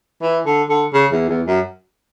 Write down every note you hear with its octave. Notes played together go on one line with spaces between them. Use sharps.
E3
D3
D3
C#3
E2
E2
F#2